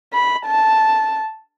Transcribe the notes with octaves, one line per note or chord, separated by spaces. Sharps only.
B5
A5